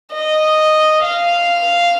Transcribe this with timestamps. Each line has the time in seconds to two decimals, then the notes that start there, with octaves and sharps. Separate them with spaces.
0.14 D#5
1.03 F5